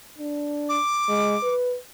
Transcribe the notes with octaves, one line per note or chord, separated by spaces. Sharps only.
D4
D6
G#3
B4